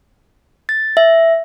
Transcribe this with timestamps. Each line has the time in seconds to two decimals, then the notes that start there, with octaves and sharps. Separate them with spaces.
0.69 A6
0.97 E5